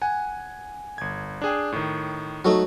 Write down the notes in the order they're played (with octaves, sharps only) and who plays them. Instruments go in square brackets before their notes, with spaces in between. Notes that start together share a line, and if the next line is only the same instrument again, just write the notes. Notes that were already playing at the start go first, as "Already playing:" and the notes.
[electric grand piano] F#5 G#5
G1 G#6
D4 G#4 G5
A2 D#3
[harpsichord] F#3 A3 D#4